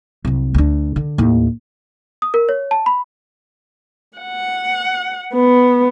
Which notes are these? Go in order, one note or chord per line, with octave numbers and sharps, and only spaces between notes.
C2 F#3
D2 D4
D3
D#2 A2
D#6
A#4
C#5
A5
B5
F#5
B3